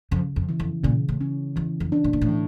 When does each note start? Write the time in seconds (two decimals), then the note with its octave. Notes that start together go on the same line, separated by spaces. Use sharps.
0.11 F2 C#3
0.36 F2
0.49 E3
0.60 F2
0.84 A#2 C#3
1.09 A2
1.21 C#4
1.56 E2 E3
1.80 F2
1.92 D4
2.04 A2
2.13 A#2
2.21 A2
2.29 E3